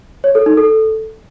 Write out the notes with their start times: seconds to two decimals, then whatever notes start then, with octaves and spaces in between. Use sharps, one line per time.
0.24 C#5
0.35 A4
0.46 D#4
0.57 A4